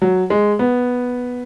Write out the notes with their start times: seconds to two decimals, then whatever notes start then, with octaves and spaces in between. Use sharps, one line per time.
0.02 F#3
0.30 G#3
0.59 B3